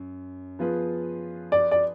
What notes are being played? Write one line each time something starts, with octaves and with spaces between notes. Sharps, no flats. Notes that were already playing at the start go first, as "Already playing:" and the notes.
Already playing: F#2
F3 B3 F4 G#4 B4
D5
D5